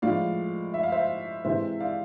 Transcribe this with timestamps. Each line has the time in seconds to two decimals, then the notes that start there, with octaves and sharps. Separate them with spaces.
0.02 A2 F3 G#3 D5 F5
0.74 E5
0.83 F5
0.92 C5 E5
1.45 C3 E3 G#3 C5 E5
1.80 D5 F5